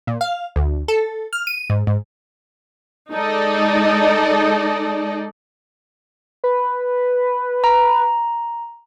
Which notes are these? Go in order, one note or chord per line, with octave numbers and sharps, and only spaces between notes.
A#2
F5
D2
A4
F6
D#7
G#2
G#2
G#3 D#4 A4 D5 D#5
B4
A#5